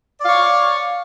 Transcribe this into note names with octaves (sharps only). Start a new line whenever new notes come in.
C#5 D5 F5